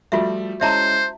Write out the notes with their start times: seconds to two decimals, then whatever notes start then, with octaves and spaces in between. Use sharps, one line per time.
0.12 F3 G3 A3 F4 F#4 E5
0.61 G#3 C#4 E4 C5 E5 A5 A#5